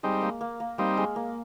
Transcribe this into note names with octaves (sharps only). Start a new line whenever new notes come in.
G3 G#3 C4 D#4
A#3
A#3
A#3
G3 A#3 C4 D#4
G#3
A#3